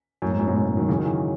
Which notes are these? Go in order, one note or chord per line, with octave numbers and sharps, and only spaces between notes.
F#2 A2
G#2
F#2 A2
G#2 B2
F#2 A2
G#2
D#3 F#3
C#3 E3
D#3 F#3
C#3 E3